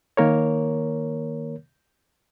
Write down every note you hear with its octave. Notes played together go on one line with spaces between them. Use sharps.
D#3 A#3 A#4 C#5